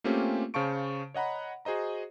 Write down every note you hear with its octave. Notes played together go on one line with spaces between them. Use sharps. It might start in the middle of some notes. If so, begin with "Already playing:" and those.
A3 A#3 C4 C#4 F4 G4
C#3 C5 F5 A5 C#6 D7
C#5 D#5 F#5 A#5 B5
F#4 G#4 C5 D#5 A#5